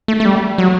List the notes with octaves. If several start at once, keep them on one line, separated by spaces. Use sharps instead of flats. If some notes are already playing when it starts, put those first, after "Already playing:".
A3
A3
G3
F#3